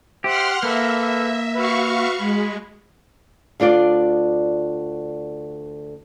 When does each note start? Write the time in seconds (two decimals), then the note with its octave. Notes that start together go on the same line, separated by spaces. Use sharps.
0.24 G4 C5 E5 F#5 C6 F6
0.63 A#3 A4 B4 E5
1.55 F#4 B4 E5 F5 C#6
2.18 G#3 B5
3.60 D2 D4 F4 D5